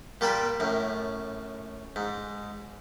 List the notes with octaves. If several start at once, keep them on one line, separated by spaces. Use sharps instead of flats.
A#2 G3 A#3 A5 B5
F#2 A2
G#2